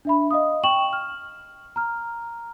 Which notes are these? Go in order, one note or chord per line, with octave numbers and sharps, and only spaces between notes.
D4 E5 B5
D#5 F5 D#6
G5 C#6 E7 F#7
F6
A#5 F6